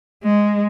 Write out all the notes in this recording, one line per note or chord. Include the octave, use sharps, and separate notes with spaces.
G#3